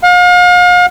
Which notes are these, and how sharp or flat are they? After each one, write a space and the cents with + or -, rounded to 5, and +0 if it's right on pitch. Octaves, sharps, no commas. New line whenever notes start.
F5 +40